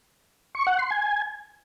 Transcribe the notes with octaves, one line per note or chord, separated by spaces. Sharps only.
C#6
F#5
C6
G#5